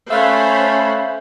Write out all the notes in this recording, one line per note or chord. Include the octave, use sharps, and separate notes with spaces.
A3 C#4 C5 C#5 E5 F5 B5 F#6